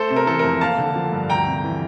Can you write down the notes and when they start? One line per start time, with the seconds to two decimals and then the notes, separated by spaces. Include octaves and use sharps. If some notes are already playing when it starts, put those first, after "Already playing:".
Already playing: A3 A4 C5
0.10 C3
0.16 A#4
0.27 E3 A4
0.39 F2 A#4
0.61 A#3 F5 A5
0.78 D3
0.96 F3
1.12 G2
1.30 D2 G5 A#5
1.47 C3
1.63 E3